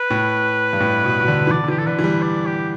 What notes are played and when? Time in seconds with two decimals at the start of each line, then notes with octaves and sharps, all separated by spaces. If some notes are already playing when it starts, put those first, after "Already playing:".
Already playing: B4
0.10 A2
0.73 G2
0.80 A2
1.04 B2
1.20 B2
1.28 D3
1.47 E3
1.51 D3 D5
1.64 D3
1.68 E3 G4
1.79 A4
1.86 D3 B4
1.99 E3
2.04 G3
2.22 D5
2.46 G4